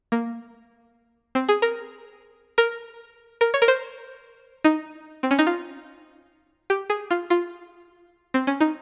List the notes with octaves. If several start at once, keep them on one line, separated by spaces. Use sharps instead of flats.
A#3
C4
G#4
A#4
A#4
A#4
C#5
A#4
C5
D#4
C4
C#4
D#4
F4
G4
G#4
F4
F4
C4
C#4
D#4